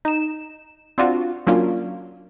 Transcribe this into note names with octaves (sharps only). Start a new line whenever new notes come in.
D#4 E7
C4 D4 F4 F#4
F#3 A#3 C#4 D4 F4